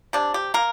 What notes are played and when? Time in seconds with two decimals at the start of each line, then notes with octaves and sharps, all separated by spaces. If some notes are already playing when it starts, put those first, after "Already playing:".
0.13 C3 D4
0.34 G4
0.54 A#3 A#4